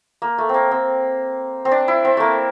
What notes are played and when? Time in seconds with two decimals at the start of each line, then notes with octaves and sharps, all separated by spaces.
0.22 A#3
0.38 A3
0.49 A#3 C4
0.71 C4
1.65 C4
1.71 D4
1.88 E4
2.05 C4
2.17 A3 A#3